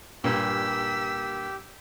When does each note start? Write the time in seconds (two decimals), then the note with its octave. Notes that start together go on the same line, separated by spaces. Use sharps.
0.24 G2 A#2 A#3 G4 E6 B6